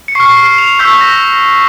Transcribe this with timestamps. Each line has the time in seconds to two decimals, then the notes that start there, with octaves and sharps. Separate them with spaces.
0.08 C#7
0.15 C#6 F6 C7
0.37 C7
0.58 F7
0.79 C#6 E6 G6 B6
1.01 A#6